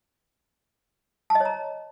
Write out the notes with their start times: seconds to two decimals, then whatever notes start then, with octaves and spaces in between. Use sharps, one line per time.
1.30 A5
1.35 D#5
1.40 C#5
1.45 A#5